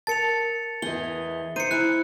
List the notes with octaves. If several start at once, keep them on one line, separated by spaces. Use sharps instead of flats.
A#4 A5 A6 C#7 F7
E2 E3 G#4 D#5 G7
D#4 C5 C#7 D#7
E4 G#5 F#6